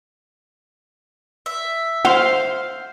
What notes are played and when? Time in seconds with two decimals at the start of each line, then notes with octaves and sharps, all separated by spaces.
1.46 E5
2.05 C5 F5 F#5 C6